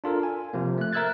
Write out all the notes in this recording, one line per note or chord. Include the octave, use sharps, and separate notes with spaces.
D4 F4 A4 A#4
G#5
C3 F3 A#3
A3 F#6
A#4 E5 E6 F#6 G#6 A6